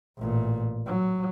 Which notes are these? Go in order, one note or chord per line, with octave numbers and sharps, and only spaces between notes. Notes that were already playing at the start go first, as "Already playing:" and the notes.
A1 A#2
F#3